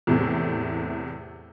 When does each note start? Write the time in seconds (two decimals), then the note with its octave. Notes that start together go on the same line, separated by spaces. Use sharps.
0.07 E2 A2 C3 A3